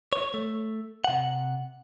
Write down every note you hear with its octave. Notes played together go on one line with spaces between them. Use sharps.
C#5
A3
C3 F#5